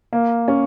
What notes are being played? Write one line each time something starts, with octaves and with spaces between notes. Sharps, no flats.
A#3
C#4